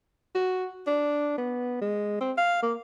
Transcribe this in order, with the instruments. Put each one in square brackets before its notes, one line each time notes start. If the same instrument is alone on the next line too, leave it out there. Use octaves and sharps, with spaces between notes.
[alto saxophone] F#4
D4
B3
G#3
C4
F5
A#3